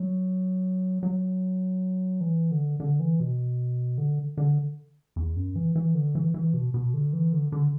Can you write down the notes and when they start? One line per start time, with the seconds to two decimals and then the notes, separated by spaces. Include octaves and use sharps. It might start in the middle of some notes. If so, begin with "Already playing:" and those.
Already playing: F#3
1.03 F#3
2.21 E3
2.51 D3
2.80 D3
3.00 E3
3.20 B2
3.98 D3
4.37 D3
5.16 E2
5.36 F#2
5.56 E3
5.75 E3
5.94 D3
6.15 E3
6.34 E3
6.53 B2
6.74 B2
6.94 D3
7.13 E3
7.33 D3
7.52 D3